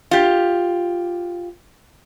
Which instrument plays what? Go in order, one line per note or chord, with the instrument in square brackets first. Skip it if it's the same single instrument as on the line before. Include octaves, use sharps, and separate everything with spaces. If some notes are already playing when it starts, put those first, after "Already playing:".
[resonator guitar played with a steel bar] F4 G4